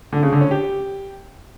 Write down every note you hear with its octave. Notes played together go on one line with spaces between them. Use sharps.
D3
C#3
D3
C#4
G4